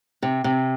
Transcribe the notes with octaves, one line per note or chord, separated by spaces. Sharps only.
C3
C3